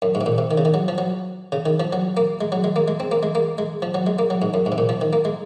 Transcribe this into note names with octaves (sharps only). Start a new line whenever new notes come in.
F#2
G#2
C3
A#2
C3
D#3
C#3
D#3
F#3
F3
F#3
C#3
D#3
F3
F#3
A#3
G#3
F#3
G#3
A#3
G#3
C4
A#3
G#3
A#3
G#3
F3
F#3
G#3
A#3
F#3
G#2
F#2
G#2
C3
A#2
F3
D#3
A#3
G#3